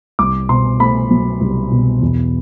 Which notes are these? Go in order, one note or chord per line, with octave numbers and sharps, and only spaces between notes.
C2 D6
B2 C6
A3 B5
F#3
C2
B2
E2